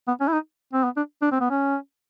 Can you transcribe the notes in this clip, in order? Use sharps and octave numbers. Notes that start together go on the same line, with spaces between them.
B3
C#4
E4
D#4
C4
B3
D4
D4
C4
B3
C#4